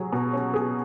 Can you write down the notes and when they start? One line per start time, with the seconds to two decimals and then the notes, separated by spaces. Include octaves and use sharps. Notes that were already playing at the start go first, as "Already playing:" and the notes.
Already playing: F#3 G#4
0.13 B2
0.33 C#4
0.54 G#4